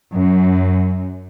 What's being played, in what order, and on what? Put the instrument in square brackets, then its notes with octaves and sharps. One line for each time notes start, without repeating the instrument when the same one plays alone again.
[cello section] F#2